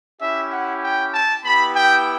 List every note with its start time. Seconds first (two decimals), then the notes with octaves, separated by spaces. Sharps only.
0.21 C#4 E4 G4 E5
0.53 F#5
0.83 G5
1.14 A5
1.45 B3 E4 G4 B5
1.75 G5